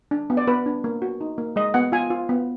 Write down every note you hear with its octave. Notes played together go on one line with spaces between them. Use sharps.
D4
B3
D5
B3 B4
D4
A#3
F#4
D#4
A#3
G#3 D#5
B3 F#5
F4 G#5
F4
B3